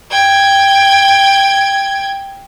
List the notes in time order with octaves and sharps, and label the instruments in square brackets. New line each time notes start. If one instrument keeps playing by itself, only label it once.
[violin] G5 G#6